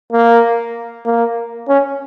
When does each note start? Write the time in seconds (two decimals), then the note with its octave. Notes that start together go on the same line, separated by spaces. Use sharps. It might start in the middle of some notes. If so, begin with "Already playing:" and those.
0.12 A#3
1.06 A#3
1.68 C#4